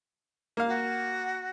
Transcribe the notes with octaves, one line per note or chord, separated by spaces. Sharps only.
A#3 F5
F#4